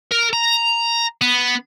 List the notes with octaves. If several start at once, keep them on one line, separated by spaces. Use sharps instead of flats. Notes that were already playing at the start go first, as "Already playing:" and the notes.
A#4
A#5
B3